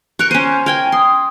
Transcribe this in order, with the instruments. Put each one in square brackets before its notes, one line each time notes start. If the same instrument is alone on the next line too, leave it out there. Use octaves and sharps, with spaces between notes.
[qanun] A#4 C#6 [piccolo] F#6
[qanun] C#4 C5 [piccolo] D#7
[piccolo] G6
[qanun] A#4 G5 G#5 [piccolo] G#6
[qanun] C6 [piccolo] D#6